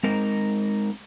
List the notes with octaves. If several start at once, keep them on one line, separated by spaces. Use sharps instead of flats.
G#3 C4 D#4 A#4